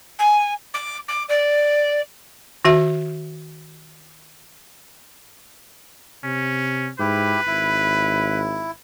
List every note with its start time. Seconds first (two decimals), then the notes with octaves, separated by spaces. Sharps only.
0.19 G#5
0.74 D6
1.08 D6
1.28 D5
2.65 D#3 F#4 E5
6.24 C3 C#4
6.99 G#2 E4 G4 B4
7.47 G#1 E4